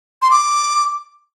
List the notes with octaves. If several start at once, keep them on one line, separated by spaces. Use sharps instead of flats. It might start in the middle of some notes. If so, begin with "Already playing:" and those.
C6
D6